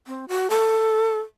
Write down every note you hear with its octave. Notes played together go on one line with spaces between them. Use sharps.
C4
F#4
A4